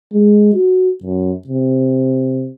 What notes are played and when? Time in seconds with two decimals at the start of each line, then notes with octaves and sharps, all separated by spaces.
0.13 G#3
0.53 F#4
1.03 F#2
1.47 C3